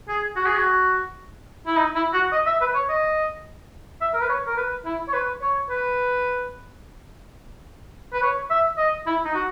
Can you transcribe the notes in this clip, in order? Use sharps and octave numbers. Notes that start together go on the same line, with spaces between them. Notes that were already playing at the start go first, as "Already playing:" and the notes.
G#4
F#4
G#4
F#4
E4
D#4
E4
F#4
D#5
E5
B4
C#5
D#5
E5
A#4
B4
C#5
A#4
B4
E4
C#5
B4
C#5
B4
B4
C#5
E5
D#5
E4
D#4
F#4